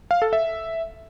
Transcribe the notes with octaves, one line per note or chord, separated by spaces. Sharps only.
F5
A4
E5